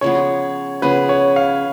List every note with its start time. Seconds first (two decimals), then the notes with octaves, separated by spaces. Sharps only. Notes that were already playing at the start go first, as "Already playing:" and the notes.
0.01 C#3 F3 B3 C#5
0.82 C#3 F3 B3 B4
1.09 C#5
1.36 F5